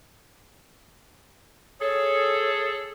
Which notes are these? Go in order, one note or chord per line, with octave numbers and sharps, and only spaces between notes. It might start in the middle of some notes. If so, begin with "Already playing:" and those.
G#4 A4 C#5